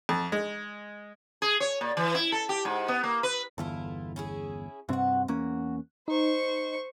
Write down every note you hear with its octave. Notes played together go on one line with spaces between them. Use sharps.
F2
G#3
G#4
C#5
A#2
E3
E4
A4
G4
G#2
B3
A#3
B4
G1 E2 E4 F4 A4
C#4 E4 G#4
G2 C3 C4 F#4 F#5
E2 A#3 C#4 F#4
D#4 C5 C#6